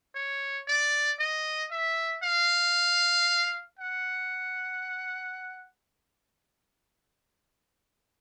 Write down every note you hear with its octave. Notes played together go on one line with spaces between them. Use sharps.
C#5
D5
D#5
E5
F5
F#5